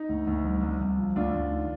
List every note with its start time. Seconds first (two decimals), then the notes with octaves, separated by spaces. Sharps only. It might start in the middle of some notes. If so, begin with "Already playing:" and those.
Already playing: D#4
0.09 D2
0.27 D2
0.44 C2
0.63 C2
0.81 C2
0.98 F3
1.16 D2 D4 F4
1.34 D2
1.51 D#3